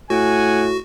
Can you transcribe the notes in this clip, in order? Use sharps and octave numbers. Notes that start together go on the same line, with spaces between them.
A2 F#4 F#5 G#5